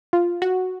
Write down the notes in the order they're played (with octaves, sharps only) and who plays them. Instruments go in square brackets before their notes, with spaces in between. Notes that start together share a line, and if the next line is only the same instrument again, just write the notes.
[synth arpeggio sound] F4
F#4